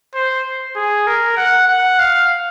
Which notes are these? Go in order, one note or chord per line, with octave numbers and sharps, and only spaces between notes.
C5
G#4
A#4
F#5
F#5
F5